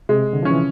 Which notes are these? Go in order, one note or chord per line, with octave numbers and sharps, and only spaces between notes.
C3 G#3
D3
F3 C#4
E3